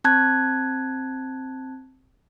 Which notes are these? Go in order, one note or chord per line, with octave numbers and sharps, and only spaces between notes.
C4 A5 F#6 G#6